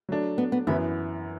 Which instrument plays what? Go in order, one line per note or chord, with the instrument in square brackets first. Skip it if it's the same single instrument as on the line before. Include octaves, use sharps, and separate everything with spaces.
[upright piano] F#3 A3 D4
[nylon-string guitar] B3
B3
[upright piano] F#2 E3 B3 [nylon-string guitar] E4